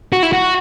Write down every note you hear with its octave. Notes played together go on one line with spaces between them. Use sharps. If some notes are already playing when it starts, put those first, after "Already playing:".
F#4
E4
F#4